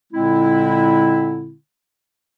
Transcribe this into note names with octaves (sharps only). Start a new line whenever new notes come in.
A#2 D3 G#3 C4 E4